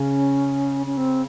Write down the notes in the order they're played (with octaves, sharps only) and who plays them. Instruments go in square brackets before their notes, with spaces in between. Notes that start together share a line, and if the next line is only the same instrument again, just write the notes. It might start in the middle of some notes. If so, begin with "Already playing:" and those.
Already playing: [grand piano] C#3 [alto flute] C#4
[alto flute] C#4
C4